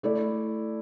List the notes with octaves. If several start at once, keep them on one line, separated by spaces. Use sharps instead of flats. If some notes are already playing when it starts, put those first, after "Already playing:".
A3 E4 A4 D5